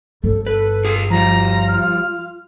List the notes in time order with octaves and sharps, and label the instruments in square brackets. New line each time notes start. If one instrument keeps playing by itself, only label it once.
[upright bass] G1 [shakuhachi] A4
[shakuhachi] A4 [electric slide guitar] B4
[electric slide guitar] F4 G#4
[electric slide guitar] F3 G3 [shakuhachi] F4 [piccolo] A#5
[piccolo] F6